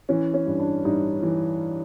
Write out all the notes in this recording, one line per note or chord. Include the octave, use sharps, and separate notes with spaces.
E3 C#4
C#4
G2
D4
G2 D#4
E3